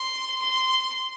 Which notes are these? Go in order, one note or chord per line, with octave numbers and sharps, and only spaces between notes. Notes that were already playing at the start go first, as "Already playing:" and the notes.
Already playing: C6
C6